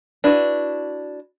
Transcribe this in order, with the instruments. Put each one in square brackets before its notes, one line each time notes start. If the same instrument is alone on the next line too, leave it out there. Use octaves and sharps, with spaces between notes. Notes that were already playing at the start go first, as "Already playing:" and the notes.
[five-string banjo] D4 E4 F#4 B4